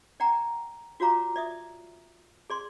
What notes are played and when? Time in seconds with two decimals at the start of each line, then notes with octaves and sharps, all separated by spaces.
0.20 D5 F#5 G5 A#5
1.00 F4 F#4 C#5 F5 A#5 D6
1.36 D5 E5 D#6
2.50 G#4 D5 C6